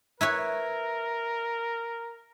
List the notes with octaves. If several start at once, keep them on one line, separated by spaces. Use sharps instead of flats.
E4 A#4 B4 C#5